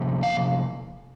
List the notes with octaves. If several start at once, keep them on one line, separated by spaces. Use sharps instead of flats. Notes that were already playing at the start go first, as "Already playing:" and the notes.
Already playing: C3 F3 A#3
F5